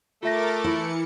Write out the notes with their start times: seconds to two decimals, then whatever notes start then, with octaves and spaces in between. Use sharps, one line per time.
0.23 A3 F4 A#4 E5 D6 A6 A#6
0.64 E3 E4 C#7